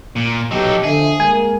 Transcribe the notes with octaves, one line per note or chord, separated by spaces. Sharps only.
A#2
B1 F#3 G4 A4 D#5
D3 F3 G#4 E5
G#3 A#3 A#4 G#5